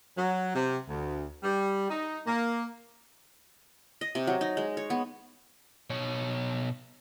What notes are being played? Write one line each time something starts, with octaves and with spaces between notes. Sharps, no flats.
F#3
C3
D2
G3
D#4
A#3
D#5
C3
F#3
D#4
G#3
C#5
B3
B2 C#5